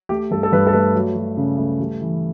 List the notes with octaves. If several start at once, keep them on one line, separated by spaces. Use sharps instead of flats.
A3 G4
G2 A4
A4
G2 B4
A4
A3 B4
F#3
F#3
C#3
A3
G3
E3